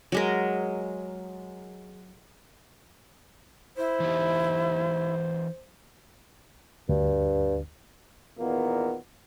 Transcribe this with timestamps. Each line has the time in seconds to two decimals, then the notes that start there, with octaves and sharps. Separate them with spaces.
0.12 F#3 G#3 A#4
3.77 E4 C5
4.00 E3 D#4 G4
6.89 D2 G2
8.38 E2 A#2 D#3 A#3 B3